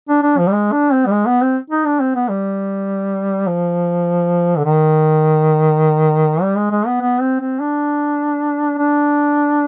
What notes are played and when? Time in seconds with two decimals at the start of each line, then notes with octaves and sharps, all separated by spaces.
0.09 D4
0.23 D4
0.38 F3
0.47 G3
0.53 G#3
0.72 D4
0.92 C4
1.06 G3
1.12 G#3
1.26 B3
1.42 C4
1.70 D#4
1.85 D4
2.00 C4
2.15 B3
2.29 G3
3.47 F3
4.57 D3
4.65 D#3
6.42 G3
6.56 G#3
6.71 G#3
6.86 B3
7.01 B3
7.20 C4
7.40 C4
7.60 D4
8.78 D4